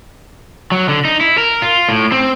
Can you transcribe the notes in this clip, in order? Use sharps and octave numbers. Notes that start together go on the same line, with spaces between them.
F#3
D3
D#4
E4
A#4
F4
A2
C4